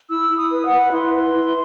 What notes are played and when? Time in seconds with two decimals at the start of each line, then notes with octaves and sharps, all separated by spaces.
0.09 E4 E6
0.30 E4
0.36 D#6
0.51 B4
0.64 F#5
0.71 B4
0.91 E4 C6
1.13 B4
1.33 E4